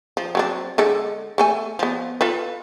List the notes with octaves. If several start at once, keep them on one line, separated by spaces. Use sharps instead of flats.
F3
F#3 C4 D4
D3 G#3 A4
A3 A4 G#5
F3 B3
F4 A4 B4